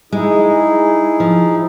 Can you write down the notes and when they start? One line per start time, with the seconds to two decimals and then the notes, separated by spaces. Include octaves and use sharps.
0.12 G#3 D#4 E4 G#4
1.20 F3